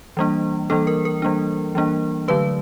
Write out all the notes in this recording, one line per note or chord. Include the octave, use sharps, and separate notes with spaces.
E3 G3 A#3 D4
E3 G3 A#3 D4 A4
A#4
A#4
E3 G3 A#3 D4
E3 G3 A#3 D4
D3 F#3 A3 B4